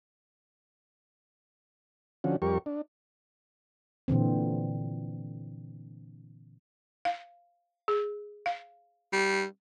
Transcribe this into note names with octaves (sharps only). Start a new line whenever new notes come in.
D3 F3 C#4 F#4
F2 G3 G4 A#4 C#6
D4
A#2 D3 E3 C4
F5
G#4
F5
G3